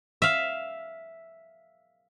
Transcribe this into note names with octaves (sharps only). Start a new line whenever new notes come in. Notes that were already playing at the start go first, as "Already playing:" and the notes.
E5 F5